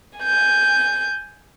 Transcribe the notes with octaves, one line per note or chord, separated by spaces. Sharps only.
G#5 G6